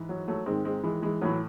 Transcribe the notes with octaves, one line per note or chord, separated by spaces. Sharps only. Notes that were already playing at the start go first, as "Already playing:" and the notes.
Already playing: G#2 E3
F#3
F#3 A3
G#2 D#3 G#3 C4
G#3 C4
E3 G#3
E3 G#3
A2 E3 F#3